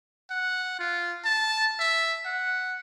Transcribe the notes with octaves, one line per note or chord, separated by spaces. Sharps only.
F#5
F4
A5
E5
F#5